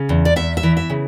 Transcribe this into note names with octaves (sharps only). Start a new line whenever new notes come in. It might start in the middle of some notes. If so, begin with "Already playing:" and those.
Already playing: C#3
E2
D5
E2 E5
E5
E3
E5
C#3